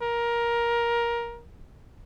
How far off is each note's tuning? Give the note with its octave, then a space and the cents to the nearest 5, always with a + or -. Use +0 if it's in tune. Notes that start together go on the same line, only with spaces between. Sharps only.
A#4 +15